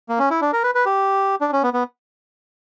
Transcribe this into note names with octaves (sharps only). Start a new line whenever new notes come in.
A#3
C#4
E4
D4
A#4
B4
B4
G4
D4
C#4
B3
B3